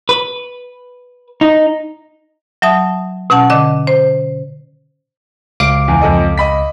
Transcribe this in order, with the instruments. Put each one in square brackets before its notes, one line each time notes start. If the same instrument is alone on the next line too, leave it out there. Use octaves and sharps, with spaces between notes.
[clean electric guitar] B4
D#4
[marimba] F#3 E5 A5 D#6
B2 C#4 F#5 A5
D3 D#5 D6
C5
[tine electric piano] C#2 F5 D6 [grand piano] D7
[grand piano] E2 E3
F2 A4 D#5
D#5 B5 B6